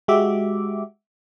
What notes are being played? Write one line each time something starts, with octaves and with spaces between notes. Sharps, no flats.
G#3 F#4 G4 E5 D6